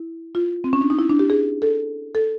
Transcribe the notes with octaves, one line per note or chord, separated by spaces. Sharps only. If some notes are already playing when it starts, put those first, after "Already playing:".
Already playing: E4
F4
C4
C#4
D4
D#4
E4
D4
G4
G#4
A4
A4